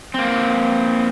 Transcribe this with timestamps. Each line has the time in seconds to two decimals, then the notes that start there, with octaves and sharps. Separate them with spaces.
0.14 A#3 C4